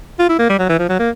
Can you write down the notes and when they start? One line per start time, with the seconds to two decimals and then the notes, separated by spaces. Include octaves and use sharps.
0.19 F4
0.29 E4
0.39 A#3
0.49 G3
0.59 F#3
0.69 E3
0.79 F3
0.89 F#3
0.99 A#3